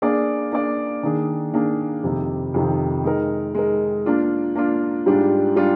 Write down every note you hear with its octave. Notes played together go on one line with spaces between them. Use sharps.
A#3 D4 G#4 D5
A#3 D4 G#4 D5
D#3 A#3 D4 G#4
D#3 A#3 D4 G#4
F2 C3 D#3
F2 C3 D#3
G#3 D#4 A#4
G#3 D#4 A#4
A#3 D4 F4
A#3 D4 F4
G#2 G3 D4 F4
G3 D4 F4